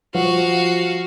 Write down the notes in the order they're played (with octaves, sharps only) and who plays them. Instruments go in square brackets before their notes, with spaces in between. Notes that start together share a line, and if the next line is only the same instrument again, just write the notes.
[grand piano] F3 [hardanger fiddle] F#4 F5